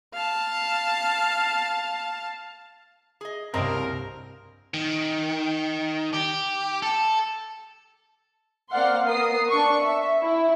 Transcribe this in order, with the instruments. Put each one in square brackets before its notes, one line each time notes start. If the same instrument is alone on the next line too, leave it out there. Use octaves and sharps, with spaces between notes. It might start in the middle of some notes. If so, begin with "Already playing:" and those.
[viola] F5 A5
[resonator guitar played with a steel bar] G#4 D#5
[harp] C2 G2 [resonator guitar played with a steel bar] C#3 A#3 A5 [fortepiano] C4 D#5 [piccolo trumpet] A#4
[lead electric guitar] D#3
G4
A4
[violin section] A#3 C4 D5 F5 F#5 C6
B3 A#4 D#6 C7
D4 C#6
E5
E4